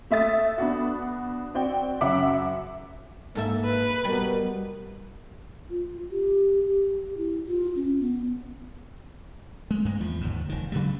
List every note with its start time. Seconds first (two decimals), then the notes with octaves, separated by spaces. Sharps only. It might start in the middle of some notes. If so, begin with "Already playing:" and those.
0.10 A3 E5 D#6 A6
0.58 B3 D4 F#4
1.55 C4 F#4 D5 G5
2.01 F#2 C#3 E5 F#5 D6
3.35 G#2 A#3 A4 E5
3.65 B4
4.05 B2 G3 A#4
5.70 F4
6.11 G4
6.67 G4
7.18 E4
7.48 F4
7.76 C#4
8.00 B3
9.71 G#3
9.85 G2 G#3 A#3
10.00 E2 F3
10.21 G1 D#2 G#2
10.49 F1 D#3
10.72 C#3 F#3 G3